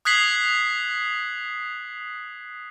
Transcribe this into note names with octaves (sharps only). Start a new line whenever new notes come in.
D#6 F#6 G#6 B6 C7 F#7